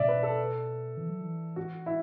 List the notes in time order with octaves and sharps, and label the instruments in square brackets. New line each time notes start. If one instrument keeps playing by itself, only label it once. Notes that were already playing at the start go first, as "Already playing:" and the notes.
Already playing: [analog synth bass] B2 [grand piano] D5 E5
[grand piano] B4
A4
[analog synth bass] E3
F#3
E3
[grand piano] F#4
E4